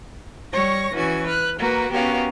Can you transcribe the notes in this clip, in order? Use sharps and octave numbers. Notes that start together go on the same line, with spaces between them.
G3 C#5 C#6 A#6
E3 C#4 F#4 G#5
B4 F6 F#6
A#3 F#4 A#4 B4
B3 C#4 F#4 G4 A#4 F5